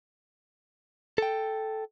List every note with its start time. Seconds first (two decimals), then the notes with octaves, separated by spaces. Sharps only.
1.18 A4 G5